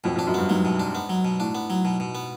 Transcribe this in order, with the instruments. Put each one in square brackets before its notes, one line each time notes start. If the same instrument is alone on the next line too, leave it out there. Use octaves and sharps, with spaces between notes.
[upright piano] F2 [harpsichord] B2
[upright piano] F2
[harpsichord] D4
[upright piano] F#2
[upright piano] G2 [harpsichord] B3
[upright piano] G#2 [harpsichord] F#3
[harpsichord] B2
D4
B3
F#3
B2
[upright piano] A2 [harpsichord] D4
[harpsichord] B3
F#3
B2
B2
B3